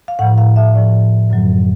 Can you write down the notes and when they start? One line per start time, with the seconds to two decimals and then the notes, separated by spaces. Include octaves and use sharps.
0.08 F5
0.19 A2 F3 F#5
0.38 F5
0.56 E5
0.75 A2 F3 D5
1.30 F#2 D3 F#3